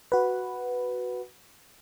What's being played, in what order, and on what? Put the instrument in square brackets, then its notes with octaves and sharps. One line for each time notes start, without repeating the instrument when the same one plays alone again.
[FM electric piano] F#4 B4